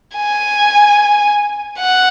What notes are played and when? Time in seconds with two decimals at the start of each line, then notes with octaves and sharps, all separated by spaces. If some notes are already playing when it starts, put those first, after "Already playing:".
0.16 G#5
1.80 F#5